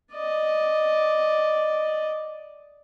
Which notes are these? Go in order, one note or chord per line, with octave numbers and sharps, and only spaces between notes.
D5 D#5